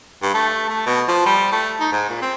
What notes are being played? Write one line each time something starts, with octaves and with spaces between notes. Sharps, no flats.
G2
A3
A3
B2
F3
G3
A3
D#4
G#2
A#2
C4